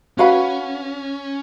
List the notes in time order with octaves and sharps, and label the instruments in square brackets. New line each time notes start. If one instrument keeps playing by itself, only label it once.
[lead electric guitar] C#4 [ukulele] F#4 B4 F5 B5